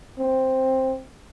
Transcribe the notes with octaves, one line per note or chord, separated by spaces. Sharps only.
C4